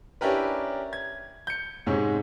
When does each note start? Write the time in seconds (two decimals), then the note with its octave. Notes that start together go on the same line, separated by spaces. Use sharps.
0.21 C#4 D4 E4 G4 A#4 B4
0.93 G#6
1.47 G6 C#7
1.87 G#2 C3 G#3 C#4